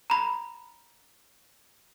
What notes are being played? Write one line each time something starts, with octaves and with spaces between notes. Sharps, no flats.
A#5 B5